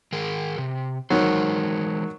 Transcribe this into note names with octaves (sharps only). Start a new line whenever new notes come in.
D#3 G#4 A#4
C3
D#3 E3 F#3 G#3 C5